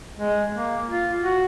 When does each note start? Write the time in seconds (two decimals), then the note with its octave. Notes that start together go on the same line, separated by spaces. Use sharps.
0.18 G#3
0.53 A#3
0.87 F4
1.22 F#4